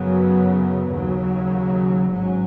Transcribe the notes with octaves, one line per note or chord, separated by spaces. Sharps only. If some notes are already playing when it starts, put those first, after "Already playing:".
Already playing: F#2 C#3 F#3 B3
D#2 C#3 F#3
G#1 G#2 F#3 C#4